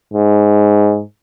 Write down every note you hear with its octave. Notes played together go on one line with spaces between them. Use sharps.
G#2